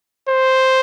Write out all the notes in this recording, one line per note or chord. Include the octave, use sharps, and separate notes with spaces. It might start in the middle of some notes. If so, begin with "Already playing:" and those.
C5